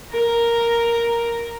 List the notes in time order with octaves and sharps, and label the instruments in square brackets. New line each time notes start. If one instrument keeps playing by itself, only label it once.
[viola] A#4 A#5